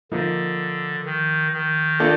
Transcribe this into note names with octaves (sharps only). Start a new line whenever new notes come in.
D3 F3 A#3 D#4
D#3
D#3
A#3 D4 F4 A4